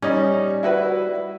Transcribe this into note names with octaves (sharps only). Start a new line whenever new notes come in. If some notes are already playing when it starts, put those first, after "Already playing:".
G3 C#4 D#4
E4 F#4 B4